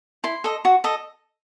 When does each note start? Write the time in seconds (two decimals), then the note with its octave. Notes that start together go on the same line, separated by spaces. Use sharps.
0.24 E4 C6
0.44 A4 D#5
0.65 F#4
0.84 A4 D#5